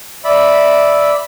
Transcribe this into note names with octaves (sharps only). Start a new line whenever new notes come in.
D5 E5 B5